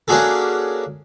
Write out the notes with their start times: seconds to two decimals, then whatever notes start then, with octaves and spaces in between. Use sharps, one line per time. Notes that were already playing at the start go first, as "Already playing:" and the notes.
0.08 A#3 C#4 D4 F#4 G#4 A4